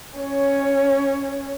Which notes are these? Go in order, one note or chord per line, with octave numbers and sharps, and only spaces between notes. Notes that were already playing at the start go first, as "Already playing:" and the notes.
C#4 C#5